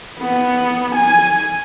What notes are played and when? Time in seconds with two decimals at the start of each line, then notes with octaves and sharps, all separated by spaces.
0.19 B3
0.96 G#5